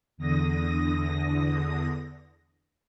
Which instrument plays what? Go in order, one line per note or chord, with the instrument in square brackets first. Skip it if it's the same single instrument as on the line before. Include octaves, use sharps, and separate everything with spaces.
[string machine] E2 D3 D#6 A#6